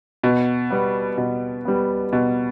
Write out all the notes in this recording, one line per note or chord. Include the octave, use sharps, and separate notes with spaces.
B2
G3 B3
B2
G3 B3
B2